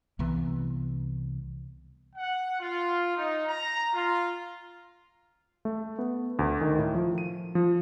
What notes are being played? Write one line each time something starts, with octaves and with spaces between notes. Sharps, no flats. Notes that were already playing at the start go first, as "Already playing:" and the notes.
C2 C3 E3 B3
F#5
F4
D#4
A#5
F4
A3
B3
D2
D#3
A2
F3
D#7
F3